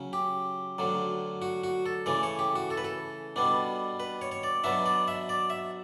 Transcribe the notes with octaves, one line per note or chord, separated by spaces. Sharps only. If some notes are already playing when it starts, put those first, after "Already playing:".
Already playing: C#3 F#3 C#4
G4
D2 D3 F#3
F#4
F#4
A4
C#3 E3 A3 D5
C#5
G4
F#4
A4
B4
A4
B2 G3 B3 D4
B4
C#5
C#5
D5
B2 F#3 B3 D4 E5
D5
E5
D5
E5